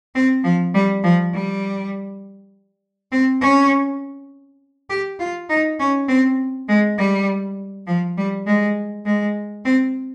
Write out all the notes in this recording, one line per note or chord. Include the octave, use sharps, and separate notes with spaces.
C4
F3
G3
F3
G3
C4
C#4
G4
F4
D#4
C#4
C4
G#3
G3
F3
G3
G#3
G#3
C4